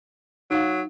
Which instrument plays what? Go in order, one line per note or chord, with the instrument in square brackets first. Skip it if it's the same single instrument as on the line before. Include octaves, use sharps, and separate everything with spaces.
[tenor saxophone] F#3 [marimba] D#4 F5